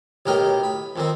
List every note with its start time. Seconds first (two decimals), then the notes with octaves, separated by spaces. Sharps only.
0.26 B1 A2 G4 A#4 D#5 G5
0.63 B5
0.96 F2 D#3 C4